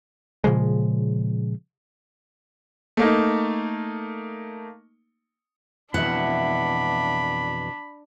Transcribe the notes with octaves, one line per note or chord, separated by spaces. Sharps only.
A#2 C#3 F3 G#3
A3 A#3 D#4
F2 B2 E3 D4 E5 F#5 B5